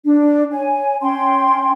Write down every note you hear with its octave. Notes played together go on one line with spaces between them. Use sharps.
D4
C#5 G#5
C#4 G5 C6